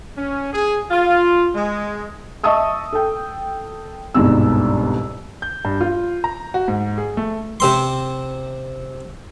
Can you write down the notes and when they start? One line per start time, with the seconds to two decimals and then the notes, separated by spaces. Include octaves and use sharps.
0.18 C#4
0.53 G#4
0.90 F4
1.54 G#3
2.44 D#5 E5 A5 C#6 D#6 E6
2.92 A4 G5
4.14 G1 C2 G#2 B2 E6
5.42 G6
5.65 G2
5.81 F4
6.24 A#5
6.54 F#4
6.68 G#2
6.98 G#4
7.17 A3
7.60 C3 C4 C6